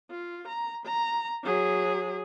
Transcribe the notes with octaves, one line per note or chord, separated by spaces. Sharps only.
F4
A#5
A#5
F#3 G#4